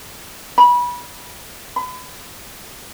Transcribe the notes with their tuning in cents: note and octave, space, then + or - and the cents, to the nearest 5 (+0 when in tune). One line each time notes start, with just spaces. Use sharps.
B5 -25
B5 +35